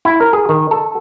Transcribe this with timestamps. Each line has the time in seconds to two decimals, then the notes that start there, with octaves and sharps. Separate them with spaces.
0.05 E4
0.20 A#4
0.33 G#4
0.49 D#3
0.71 A4